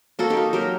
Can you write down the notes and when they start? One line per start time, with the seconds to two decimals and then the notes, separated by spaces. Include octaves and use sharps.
0.19 A#3 F#4 A4
0.30 D#4 G4
0.37 A#3
0.53 F#3 G4 A#4